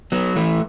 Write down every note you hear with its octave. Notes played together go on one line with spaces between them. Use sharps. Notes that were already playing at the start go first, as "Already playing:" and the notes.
F#3 B3
E3 A3